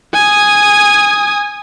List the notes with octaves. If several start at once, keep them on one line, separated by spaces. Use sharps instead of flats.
G#5 D#6